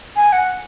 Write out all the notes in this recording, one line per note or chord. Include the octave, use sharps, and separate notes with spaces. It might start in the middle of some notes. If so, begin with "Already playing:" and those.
G#5
F#5